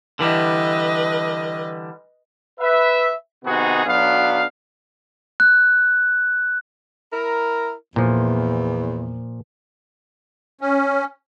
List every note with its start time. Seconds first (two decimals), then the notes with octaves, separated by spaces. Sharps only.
0.19 D3 E3 G3 B4 D#5
2.60 B4 E5
3.45 C3 D#3 B3 D#4 F#4 G#4
3.86 B1 F#3 B3 D4 F5
5.40 F#6
7.13 E4 A#4
7.96 E2 A#2 F3
10.61 C#4